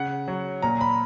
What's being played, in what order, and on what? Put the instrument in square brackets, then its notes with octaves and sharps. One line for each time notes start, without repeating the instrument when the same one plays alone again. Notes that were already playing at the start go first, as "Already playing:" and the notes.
Already playing: [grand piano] C#3 F#5
F#3
A#2 A#5
B5